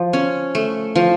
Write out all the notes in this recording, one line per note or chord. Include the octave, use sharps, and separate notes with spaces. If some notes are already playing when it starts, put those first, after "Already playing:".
Already playing: F3
C#4
A3
F3